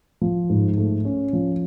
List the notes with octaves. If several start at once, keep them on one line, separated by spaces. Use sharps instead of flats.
F3
G#2
A3
C#4
F3